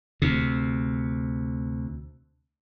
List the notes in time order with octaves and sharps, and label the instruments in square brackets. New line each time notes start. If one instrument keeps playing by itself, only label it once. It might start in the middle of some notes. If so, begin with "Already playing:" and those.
[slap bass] D2 C3